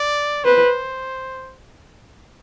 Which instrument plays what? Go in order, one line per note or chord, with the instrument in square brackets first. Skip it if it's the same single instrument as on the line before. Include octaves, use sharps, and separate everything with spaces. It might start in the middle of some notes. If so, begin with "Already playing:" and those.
Already playing: [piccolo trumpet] D5
[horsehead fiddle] B4 [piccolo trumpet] C5